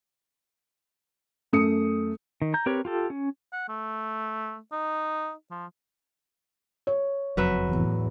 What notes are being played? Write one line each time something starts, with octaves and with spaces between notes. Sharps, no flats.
F#2 A3 D#6 C#7
D#3
A#5 G6
C4 G4 A#4 B4 C#5
F4 G4 A4
C#4
F#5
A3
D#4
F3
C#5
F#1 F2 F#3 B4 E5
E2 A2 E3